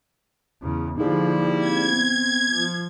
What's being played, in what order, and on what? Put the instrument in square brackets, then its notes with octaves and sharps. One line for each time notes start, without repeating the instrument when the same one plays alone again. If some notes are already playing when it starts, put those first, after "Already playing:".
[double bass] E2 C#3
[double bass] D3 F3 [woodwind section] G3 A#3 E4 [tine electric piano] D#4 G#4
[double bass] C4 [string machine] G#6
[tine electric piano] B3
[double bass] F3